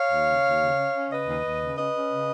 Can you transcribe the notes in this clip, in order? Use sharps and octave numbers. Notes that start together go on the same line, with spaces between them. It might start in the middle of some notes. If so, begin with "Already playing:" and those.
Already playing: C#5 F5
D#2
C#3
D#2
C#3
C#4
C#4
C#3 B4 D#5
D#2
D#2
C#3
C#4 B4 D#5
C#4
C#3